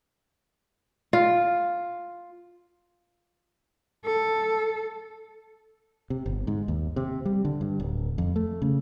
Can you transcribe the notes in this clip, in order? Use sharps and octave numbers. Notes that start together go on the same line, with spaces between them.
F4
A4
C3
G1
G#2
D#2
C3
G3
D3
G2
D1
F2
A3
C#3